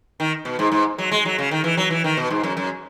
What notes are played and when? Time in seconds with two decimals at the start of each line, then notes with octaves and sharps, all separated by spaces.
0.20 D#3
0.45 B2
0.59 G#2
0.72 G#2
0.98 F#3
1.12 G#3
1.25 F#3
1.38 C#3
1.51 D#3
1.64 E3
1.77 F#3
1.90 E3
2.04 D#3
2.17 B2
2.30 G#2
2.44 F#2
2.57 F#2